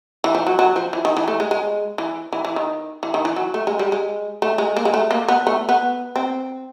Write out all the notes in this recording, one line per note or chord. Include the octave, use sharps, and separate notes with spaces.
E3
F3
F#3
F#3
F3
E3
D#3
E3
A3
G#3
G#3
E3
E3
E3
D#3
E3
D#3
E3
F#3
A3
G#3
G3
G#3
A3
G#3
A#3
G#3
A3
A#3
B3
A3
B3
C4